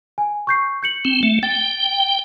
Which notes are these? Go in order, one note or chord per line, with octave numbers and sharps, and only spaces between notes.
G#5
C#6 G6 C7
G6 C#7 F#7
C4
A3
G5 A6